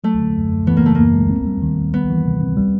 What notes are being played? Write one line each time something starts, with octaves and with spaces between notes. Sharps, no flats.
F#3 A3
D3
F#2
F#2
E3 B3
A#3
C#3 A3
F#2 A#3
G#3
C4
G3
D#3
D#3
G3 B3
E3
C3
C4
G3